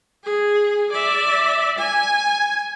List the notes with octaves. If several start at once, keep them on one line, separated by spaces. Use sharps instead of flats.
G#4
D5 E5
G#5